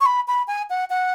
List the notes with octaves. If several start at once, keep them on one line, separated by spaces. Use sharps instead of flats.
C#6
B5
B5
G#5
F#5
F#5